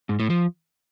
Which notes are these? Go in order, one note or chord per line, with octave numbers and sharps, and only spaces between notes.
G#2
A2
F3